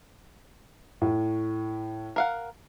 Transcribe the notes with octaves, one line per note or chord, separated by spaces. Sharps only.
A2
A#4 F5 F#5